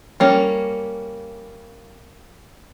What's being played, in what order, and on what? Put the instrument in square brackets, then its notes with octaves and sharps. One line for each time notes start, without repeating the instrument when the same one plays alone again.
[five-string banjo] G3 A#3 C#4